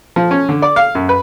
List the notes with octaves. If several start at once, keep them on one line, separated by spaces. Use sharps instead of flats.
F3
C#4
D3
D5
F5
F#2
B4